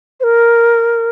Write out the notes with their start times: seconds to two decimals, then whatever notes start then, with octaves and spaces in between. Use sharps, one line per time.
0.20 C5
0.24 A#4